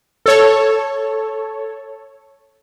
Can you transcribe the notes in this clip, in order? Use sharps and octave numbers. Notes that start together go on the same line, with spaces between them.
A4 C#5